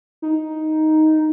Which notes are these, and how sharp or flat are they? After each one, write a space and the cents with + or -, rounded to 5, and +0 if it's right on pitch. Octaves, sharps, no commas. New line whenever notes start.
D#4 +5